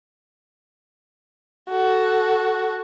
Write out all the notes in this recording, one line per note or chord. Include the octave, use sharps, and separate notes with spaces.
F#4 A4